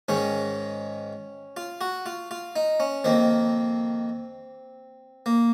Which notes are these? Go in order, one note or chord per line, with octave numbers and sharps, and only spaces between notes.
G#2 D#3 G#3 C#4
F4
F#4
F4
F4
D#4
C#4
F2 D#3 A#3 C4
A#3